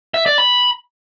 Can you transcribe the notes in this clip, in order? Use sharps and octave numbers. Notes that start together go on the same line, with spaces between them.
E5
D5
B5